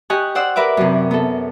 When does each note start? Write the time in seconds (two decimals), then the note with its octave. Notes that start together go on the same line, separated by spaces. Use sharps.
0.10 G4 D#5 G#5 C#6 F#6
0.35 C5 D5 F#5 E6
0.56 A#4 B4 E5 D6
0.77 F#2 C3
1.11 B3 A4